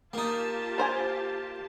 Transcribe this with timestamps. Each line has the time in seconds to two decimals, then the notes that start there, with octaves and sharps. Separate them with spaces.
0.13 A#3 D#4 F4 G4 A5
0.78 A#4 C5 G#5